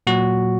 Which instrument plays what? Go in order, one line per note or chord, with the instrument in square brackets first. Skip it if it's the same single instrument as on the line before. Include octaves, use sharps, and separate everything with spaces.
[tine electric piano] A#2 F#3 F#4